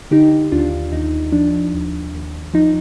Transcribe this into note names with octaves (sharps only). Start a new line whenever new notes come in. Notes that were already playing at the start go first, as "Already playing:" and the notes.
D3 D#4 G4
D#2 D4 F4
D#2 D#4
F3 D4
D#2
D#2
F3 D#4